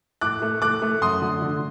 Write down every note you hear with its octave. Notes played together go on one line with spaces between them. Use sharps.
A2 D6 F#6
A3
A3 D6 F#6
A3
F#2 C6 D#6
D3
D3